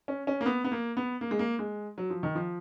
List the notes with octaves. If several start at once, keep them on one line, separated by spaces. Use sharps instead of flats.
C#4
C#4
A#3
B3
B3
A#3
B3
A#3
G#3
A#3
G#3
F#3
F3
D#3
F3